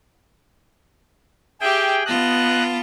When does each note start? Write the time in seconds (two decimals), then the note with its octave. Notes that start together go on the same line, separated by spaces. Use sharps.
1.61 G4 G#4 E5 G5
2.05 B3 F4 D#5 A5 F#6